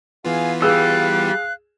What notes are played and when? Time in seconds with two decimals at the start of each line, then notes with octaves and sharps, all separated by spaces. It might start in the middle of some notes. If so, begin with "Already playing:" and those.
0.24 E3 B3 F4 G#4 F5 G#5
0.62 G3 G#4 F5 E6 F#6